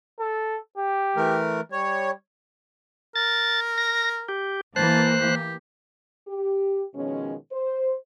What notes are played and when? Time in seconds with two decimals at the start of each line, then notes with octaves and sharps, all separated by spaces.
0.20 A4
0.78 G4
1.17 E3 A3 A#4
1.72 G3 C#5
3.16 A#4 A6
3.78 A#6
4.29 G4
4.76 E3 A#3 C5 A5 F#6
5.20 G4
6.28 G4
6.95 B2 D#3 F3 G#3 C#4
7.52 C5